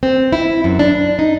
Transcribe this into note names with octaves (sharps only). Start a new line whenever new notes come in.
C4
E4
F#2
D4
D#4